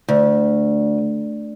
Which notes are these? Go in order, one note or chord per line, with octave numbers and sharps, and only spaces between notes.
D2